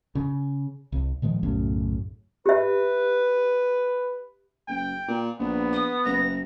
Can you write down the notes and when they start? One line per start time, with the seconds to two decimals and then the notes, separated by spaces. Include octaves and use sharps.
0.15 C#3
0.92 C2
1.22 A#2 D#3 F3 G#3
1.43 B1 F#2 A2 C#3
2.46 G4 B4 E5
4.68 F#1 G5
5.08 A#2
5.39 A#1 B3
5.73 D#6
6.05 F#1 A#6